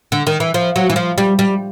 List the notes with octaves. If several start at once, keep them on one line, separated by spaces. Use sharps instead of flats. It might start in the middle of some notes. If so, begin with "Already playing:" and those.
D3
D#3
E3
F3
F#3
E3
F3
G3
G3